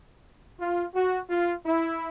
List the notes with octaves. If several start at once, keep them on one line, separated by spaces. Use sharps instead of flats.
F4
F#4
F4
E4